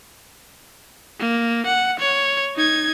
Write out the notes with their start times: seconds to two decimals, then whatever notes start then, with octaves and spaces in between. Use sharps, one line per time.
1.19 A#3
1.66 F#5
2.00 C#5
2.56 D#4 G#6